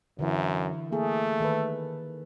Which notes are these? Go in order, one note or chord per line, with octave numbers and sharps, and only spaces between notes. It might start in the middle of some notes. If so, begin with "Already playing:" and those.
F#2 D3 E3 E4
A3 A#3 G#4
D#3 A4 B4